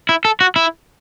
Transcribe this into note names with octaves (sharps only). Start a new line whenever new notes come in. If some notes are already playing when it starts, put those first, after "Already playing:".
E4
A4
F#4
E4